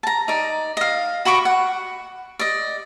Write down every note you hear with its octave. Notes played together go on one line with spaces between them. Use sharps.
A5 A#5
D#4 D5
D#5 F5
F#4 B5 C#6 D6
F#5
D5 D#5